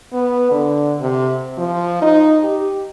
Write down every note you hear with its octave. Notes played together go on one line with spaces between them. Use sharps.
B3
D3
C3
F3
D#4
G4